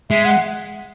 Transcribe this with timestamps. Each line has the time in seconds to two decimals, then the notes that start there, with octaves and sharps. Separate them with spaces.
0.10 G#3 E5
0.25 F#5